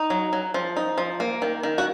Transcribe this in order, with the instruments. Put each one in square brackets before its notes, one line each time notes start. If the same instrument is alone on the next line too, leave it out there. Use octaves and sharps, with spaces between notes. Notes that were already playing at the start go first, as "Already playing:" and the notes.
Already playing: [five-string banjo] D#4
F#3
F#3
F3
D#4
F3
A#3
D#3
D#3
F#4